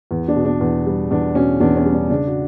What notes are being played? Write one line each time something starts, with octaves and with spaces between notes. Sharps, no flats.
E2
D4
B2
D4
E2
G3
E2 D4
B2 C#4
E2 D4
C#4
G3
D4
C#3 D4
F#4